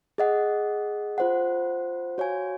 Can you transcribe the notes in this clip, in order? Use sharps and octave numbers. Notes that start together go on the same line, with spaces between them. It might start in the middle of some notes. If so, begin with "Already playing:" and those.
G#4 D#5 F#5
F4 C5 F#5
F#4 C#5 F5 G#5